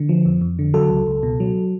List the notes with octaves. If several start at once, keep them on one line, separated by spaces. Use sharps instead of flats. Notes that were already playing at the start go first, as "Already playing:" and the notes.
Already playing: D3
F3
F2
F2
D3
F#3 A4
C#2
C#2
B2
F#3